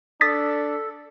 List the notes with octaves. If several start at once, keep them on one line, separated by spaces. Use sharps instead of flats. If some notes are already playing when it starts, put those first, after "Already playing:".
D4 A4 D#6 A6 B6